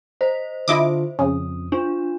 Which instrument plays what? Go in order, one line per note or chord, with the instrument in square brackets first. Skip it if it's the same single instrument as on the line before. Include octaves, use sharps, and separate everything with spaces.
[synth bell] C5 [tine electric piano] D#5
[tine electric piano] D3 D4 F4 [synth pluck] E4 D#5 D6
[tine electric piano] F2 D#6 [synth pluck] C#3
[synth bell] D4 [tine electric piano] F4